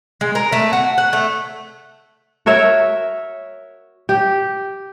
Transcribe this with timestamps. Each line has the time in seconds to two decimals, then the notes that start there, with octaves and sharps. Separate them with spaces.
0.21 G#3
0.35 A#4
0.52 A3
0.73 F#4
0.98 F#5
1.13 A3
2.46 F#4 A#4 C#5 E5
4.09 G4